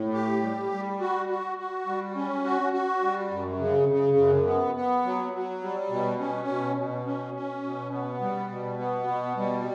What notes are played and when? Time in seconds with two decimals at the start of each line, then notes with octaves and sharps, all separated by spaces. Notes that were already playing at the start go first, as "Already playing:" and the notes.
Already playing: A2
0.13 G4
0.43 G3
0.72 G3
1.00 F#4
1.29 F#4
1.58 F#4
1.86 G3
2.15 C#4
2.44 F#4
2.73 F#4
3.02 G3
3.31 F#2
3.59 C#3
3.88 C#3
4.17 F#2
4.46 B3
4.75 B3
5.04 F#3
5.33 F#3
5.62 G3
5.90 B2
6.19 C#4
6.48 B2
6.77 B2
7.06 C#4
7.34 C#4
7.63 B2
7.92 B3
8.21 G3
8.49 B2
8.78 B3
9.07 B2
9.37 G3